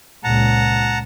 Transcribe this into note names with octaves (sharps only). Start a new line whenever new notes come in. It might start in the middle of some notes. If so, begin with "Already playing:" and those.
C#2 A#2 F#5 A5 A#5